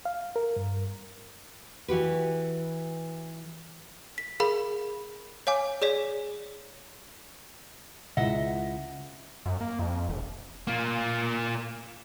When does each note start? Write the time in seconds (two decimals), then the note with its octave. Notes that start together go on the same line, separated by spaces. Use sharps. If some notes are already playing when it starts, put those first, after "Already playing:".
0.05 F5
0.36 A#4
0.56 G2
1.88 E3 F#4 G4 B4
4.18 B6
4.40 G#4 A#4 F5 B5
5.47 C#5 F5 G#5 D6
5.82 G#4 C#5 D5 B6
8.17 C#2 E4 D#5 E5 F#5
9.46 F#2
9.61 A#3
9.79 F2
10.09 E1
10.67 A#3 F4